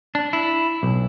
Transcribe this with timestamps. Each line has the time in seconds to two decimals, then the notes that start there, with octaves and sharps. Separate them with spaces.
0.15 D4
0.33 E4
0.83 B1